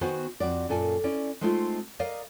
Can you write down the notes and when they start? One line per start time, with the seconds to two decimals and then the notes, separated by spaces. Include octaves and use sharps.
0.01 D#3 B3 F#4 C5 G#5
0.40 F2 F#4 D5
0.69 F#2 A#2 A4 G#5
1.04 C#4 E4 D5
1.41 G#3 A3 C4 D#4 F4
1.99 A#4 D5 D#5 F5